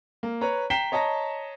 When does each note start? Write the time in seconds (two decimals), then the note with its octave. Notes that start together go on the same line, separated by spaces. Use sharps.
0.23 A#3
0.41 B4 C#5 A#5
0.70 G5 A#5 B6 C7 E7 G7
0.92 C#5 D#5 A5 A#5 A#6